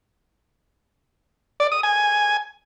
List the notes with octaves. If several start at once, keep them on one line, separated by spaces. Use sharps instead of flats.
D5
D#6
G#5